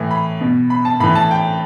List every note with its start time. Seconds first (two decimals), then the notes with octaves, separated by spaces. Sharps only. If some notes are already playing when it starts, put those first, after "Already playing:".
Already playing: A2 E3
0.11 B5
0.41 B2
0.70 B5
0.85 A5
1.00 A2 E3 B5
1.15 A5
1.31 G5